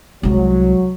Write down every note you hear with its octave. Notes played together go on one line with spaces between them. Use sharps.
C2 F#3 G#3